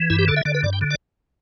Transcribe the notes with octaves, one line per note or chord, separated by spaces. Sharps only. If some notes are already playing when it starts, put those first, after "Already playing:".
Already playing: E3
G2 E4
G4
D3 A4
E5
D3 D5
B4
G2 D5
G5
D3
D5